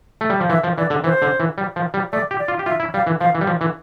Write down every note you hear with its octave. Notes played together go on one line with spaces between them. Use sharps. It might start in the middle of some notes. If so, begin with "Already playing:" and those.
A3
G3
F3
E3 E5
F3
E3 D5
D3
E3 C5
D3
E3
G3
F3
G3
A3 D5
G4
D5
F4
G4
F4 E5
E4
G3 F5
E3
F3 F5
E3
G3
F3
E3